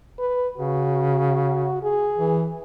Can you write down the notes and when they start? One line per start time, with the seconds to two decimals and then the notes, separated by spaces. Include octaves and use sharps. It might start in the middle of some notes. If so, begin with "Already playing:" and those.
0.19 B4
0.58 C#3 F#4
1.82 G#4
2.18 E3